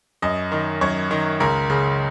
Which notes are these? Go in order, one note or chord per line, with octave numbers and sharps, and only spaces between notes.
F#2 D#5
D#3
F#2 C#5
D#3
C#2 A#4
C#3